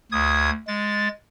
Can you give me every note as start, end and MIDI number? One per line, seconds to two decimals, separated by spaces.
0.12 0.50 38
0.12 0.50 87
0.12 0.50 92
0.68 1.08 56
0.68 1.08 93